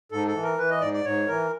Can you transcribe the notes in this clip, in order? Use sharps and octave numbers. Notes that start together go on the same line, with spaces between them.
G#2 A4
A4
E3
A#4
E3 B4
D#5
G#2 D5
D5
G#2 C#5
E3 A#4